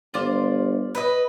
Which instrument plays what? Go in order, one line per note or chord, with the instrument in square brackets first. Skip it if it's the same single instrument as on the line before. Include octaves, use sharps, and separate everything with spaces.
[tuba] G1 [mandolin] F4 C5 D5
[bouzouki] B4 D#5